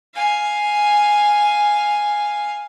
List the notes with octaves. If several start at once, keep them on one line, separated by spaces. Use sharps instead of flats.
F5 G#5